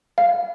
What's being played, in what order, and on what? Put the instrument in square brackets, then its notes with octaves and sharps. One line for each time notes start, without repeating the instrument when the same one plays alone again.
[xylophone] F5